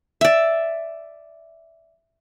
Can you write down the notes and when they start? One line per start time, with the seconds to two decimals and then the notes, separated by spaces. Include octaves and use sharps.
0.21 D5 E5